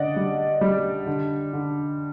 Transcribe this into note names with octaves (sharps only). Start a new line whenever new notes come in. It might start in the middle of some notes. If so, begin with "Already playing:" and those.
Already playing: D3 D5 D#5 F#5
G3
G3
D3
D3